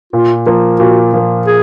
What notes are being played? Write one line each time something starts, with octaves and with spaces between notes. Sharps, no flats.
A#2 F4
F3 A#3
A#2 F#4
F3 A#3
G#4